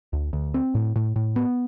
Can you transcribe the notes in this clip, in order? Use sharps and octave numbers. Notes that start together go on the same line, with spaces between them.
D2
D2
C4
A2
A2
A2
B3